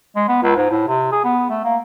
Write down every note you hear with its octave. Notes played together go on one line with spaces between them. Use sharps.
G#3
B3
C#2
G#2
A2
C3
G#4
B3
A3
A#3